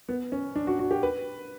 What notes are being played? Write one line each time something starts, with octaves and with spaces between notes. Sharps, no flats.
B3
C#4
D4
F#4
F#4
G4
B4